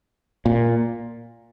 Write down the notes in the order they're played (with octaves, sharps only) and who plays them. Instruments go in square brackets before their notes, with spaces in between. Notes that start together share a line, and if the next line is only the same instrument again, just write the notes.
[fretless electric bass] A#2